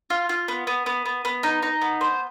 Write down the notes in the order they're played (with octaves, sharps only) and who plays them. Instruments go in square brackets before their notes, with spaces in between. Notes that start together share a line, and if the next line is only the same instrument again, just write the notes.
[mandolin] F4
F4
B3
B3
B3
B3
B3
D#4
D#4
B3
C5